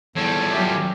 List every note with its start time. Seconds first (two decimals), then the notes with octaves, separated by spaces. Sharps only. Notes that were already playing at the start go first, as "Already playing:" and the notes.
0.16 E2 F3 G3 A4 C#5
0.53 F#3 A3 C#4 G4